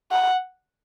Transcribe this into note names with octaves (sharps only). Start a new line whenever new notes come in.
F#5